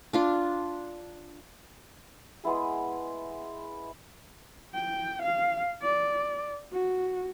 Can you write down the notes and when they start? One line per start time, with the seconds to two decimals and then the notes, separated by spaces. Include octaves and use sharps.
0.13 D4 F4 C6
2.44 G#3 B3 E4 G#4
4.74 G5
5.22 F5
5.82 D5
6.72 F#4